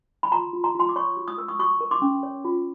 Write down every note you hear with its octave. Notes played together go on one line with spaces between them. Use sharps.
B5
F4 A#5 C6
F4
A#5 C6
F4 A#5 C6
D6
C#5 B5 C#6
F#4
D#6
A#4 E6
C#6 D#6
F#4 C#6 D#6
A#4
C6 D6
C#4
C#5
F4